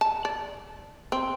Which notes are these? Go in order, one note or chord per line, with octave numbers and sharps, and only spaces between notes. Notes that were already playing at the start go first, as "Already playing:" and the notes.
A5
D5
C4